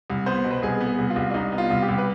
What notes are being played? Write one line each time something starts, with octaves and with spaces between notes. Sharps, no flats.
C2
B3 C5
B2
B4
C2 G#4
B3
G#4
C2
F4
C2
D4
C2 D#4
B3
F4
C2
G4
C2
B4